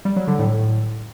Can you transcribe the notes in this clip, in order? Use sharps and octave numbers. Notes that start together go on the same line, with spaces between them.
G3
F#3
D3
A2